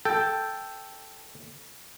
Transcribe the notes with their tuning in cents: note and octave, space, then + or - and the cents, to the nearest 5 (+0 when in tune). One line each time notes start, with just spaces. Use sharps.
A4 +0 G5 +0